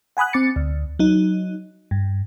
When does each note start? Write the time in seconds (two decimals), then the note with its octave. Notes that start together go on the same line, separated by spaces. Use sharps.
0.17 F#5 G#5 B5 D#6 F#6
0.33 C4 D6 A6 C#7
0.56 D2
0.99 F#3 D#4
1.91 G2